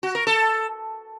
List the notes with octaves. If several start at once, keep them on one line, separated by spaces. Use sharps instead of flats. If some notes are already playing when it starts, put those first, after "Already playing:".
F#4
A#4
A4